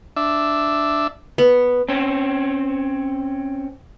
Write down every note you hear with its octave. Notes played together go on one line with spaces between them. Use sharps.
D4 E5
B3
C4 C#4